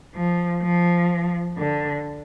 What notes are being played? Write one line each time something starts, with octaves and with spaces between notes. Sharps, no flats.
F3
F3
D3